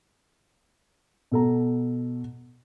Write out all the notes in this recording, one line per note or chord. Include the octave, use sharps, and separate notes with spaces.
B2 A4 A#5